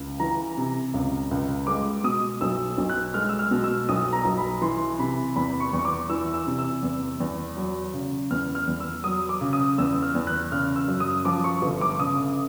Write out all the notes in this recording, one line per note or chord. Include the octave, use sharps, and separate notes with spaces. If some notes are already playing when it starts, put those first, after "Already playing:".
Already playing: C#2
E3 A#5
C3
C#2
C#2
G#3 D6
B2 D#6
B1 E6
B1
F#6
G#3 F6
E6
F6
B2
E6
B1 D#6
A#5
B1
B5
E3 C6
C3 B5
E2 B5
C#6
E2
C#6
D6
E3 E6
E6
C3
E6
E2
E2
F#3
C#3
E2 F6
F6
E2
E6
F#3 D#6
D6
C#3
D#6
E2 E6
F6
E2
F#6
C#3 F6
E6
F#2
D#6
F3 D6
C#6
G1
D6
C#3 D#6